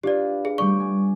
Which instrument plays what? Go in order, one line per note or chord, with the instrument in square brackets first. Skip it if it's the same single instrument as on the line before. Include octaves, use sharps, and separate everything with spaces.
[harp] D4 F4 B4 [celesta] G4 D5
[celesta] G#4
[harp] G3 A3 D5 [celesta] C#6
[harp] G#5